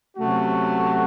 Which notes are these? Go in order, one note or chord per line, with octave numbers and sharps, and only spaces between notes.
C3 F#3 A3 C#4 F#4